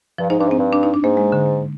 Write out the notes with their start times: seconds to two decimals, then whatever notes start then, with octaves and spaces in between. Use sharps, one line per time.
0.18 G2 F3
0.30 G#2 D#4
0.39 G2 D4
0.49 G#2 C4
0.59 G2
0.72 D4
0.83 D#4
0.94 D4
1.03 G#2 A#3
1.17 G#3
1.32 D3